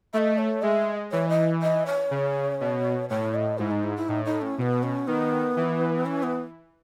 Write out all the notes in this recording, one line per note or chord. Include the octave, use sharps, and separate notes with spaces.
A3 D#5 E5
C#5
G#3 E5
E3 C#5
D#5
D#5
C#5
C#3
B2
A2 C#5
D#5
G#2 E4
D#4
E4
E4
A2 D#4
D#4
C#4
B2 B3 C#4
C#4
D#3 B3
E3
C#4
B3